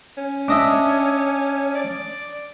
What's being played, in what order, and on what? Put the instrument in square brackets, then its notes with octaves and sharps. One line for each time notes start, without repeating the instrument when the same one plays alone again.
[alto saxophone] C#4
[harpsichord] D4 D#5 E5
[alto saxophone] D5